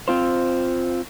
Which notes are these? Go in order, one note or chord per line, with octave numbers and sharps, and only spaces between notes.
C4 F4 C5